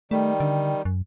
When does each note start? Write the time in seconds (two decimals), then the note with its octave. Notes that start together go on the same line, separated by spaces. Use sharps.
0.11 D#3 G3 A3
0.40 D3
0.85 F#2